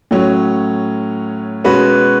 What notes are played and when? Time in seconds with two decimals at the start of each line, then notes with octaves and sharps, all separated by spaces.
0.11 A2 F#3 C#4
1.64 B2 G#3 C#4 F#4 B4